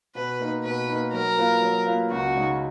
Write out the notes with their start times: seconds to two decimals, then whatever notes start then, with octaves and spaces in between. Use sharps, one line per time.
0.15 B2 B4
0.39 A#3 D#4
0.64 B2 B4
0.89 A#3 D#4
1.13 F#3 A#4
1.37 A#3 F4 B4 F5
1.62 F#3
1.86 A#3 F4 B4 F5
2.10 C#2 F#4
2.35 C#3 G#3 D#4